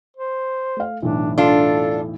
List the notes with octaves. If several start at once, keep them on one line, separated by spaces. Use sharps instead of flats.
C5
A3 F5
B1 E2 A2 D4
D4 F4 A4